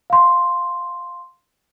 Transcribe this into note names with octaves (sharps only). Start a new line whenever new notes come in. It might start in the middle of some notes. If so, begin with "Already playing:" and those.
F5 C6